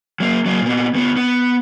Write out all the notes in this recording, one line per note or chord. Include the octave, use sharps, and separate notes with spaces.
F#3 A#3
F#3 A#3
A#2 B3
D2 B3
B3